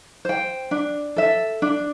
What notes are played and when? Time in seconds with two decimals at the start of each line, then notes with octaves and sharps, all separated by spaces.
0.25 C5 G5
0.71 D4
1.16 A4 E5
1.62 D4